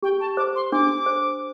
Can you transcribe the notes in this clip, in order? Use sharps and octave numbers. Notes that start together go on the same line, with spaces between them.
G4 G5
A5
C5 D6
C6
D4 D6
C5